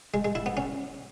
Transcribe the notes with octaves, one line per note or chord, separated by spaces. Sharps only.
G#3
G#3
E4
B3
C#4